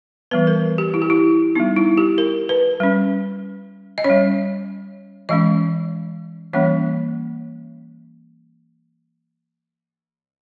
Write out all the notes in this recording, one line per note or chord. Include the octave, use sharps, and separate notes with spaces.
E3 G3 B3 B4
A#4
G4
E4
G4
E4
G3 B3 D#4
E4
G4
A#4
B4
G3 C#4
D#5
C#4 C#5
G3
E3 G#3 C#4 D#5
E3 G3 A#3 C#4 C#5